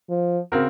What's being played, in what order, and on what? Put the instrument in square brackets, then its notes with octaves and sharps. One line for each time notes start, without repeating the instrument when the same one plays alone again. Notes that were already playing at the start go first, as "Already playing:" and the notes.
[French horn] F3
[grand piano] C#3 C4 F#4 A#4